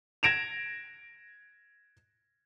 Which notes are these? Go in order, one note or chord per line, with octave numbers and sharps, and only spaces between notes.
G#6 A#6 D7 E7 F7